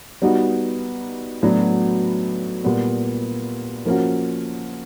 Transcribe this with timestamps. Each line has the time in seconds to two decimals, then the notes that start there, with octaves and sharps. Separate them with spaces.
0.22 G3 B3 D#4 F#4
1.43 A2 F#3 B3 D4 F#4
2.64 A#2 G3 B3
3.85 F3 A#3 C#4 F#4